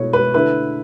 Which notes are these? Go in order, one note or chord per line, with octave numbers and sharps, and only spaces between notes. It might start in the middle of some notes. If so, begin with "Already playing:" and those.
Already playing: B2 A3 E4 C#5
B4
D3 A3 E4 B4